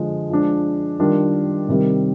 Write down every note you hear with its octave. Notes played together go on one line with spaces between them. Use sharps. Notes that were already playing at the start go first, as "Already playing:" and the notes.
Already playing: D3 F3 G#3
F3 G#3 D4
D#3 G3 D4 F4
C3 D#3 G3